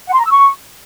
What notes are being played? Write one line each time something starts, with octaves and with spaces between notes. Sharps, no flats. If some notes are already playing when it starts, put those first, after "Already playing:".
F#5
C6
A#5
E6
C#6